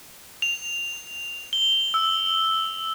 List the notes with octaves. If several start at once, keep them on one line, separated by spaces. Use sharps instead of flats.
F7
G7
E6